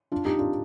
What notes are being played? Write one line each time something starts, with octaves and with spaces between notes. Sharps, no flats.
D4 F4
D#4 G4
D4 F4